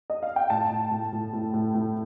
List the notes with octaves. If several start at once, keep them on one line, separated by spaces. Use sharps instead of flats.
D#5
F5
G5
A2 A5
A2
A2
A2
A2
A2
A2